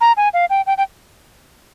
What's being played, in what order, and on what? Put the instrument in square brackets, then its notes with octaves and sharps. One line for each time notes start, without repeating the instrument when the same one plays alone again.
[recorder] A#5
G#5
F5
G5
G5
G5